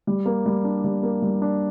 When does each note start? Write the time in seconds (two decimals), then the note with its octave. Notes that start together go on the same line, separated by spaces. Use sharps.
0.07 G3
0.26 A#3
0.46 G3
0.64 D4
0.84 G3
1.03 A#3
1.22 G3
1.42 D4